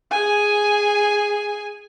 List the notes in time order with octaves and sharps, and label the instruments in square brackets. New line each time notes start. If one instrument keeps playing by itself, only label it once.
[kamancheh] G#4 G#5